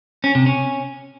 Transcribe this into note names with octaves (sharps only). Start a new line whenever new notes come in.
C#4
C3
C#4